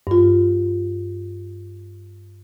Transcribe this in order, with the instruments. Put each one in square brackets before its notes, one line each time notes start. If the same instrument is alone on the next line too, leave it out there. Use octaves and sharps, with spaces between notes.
[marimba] G2 F4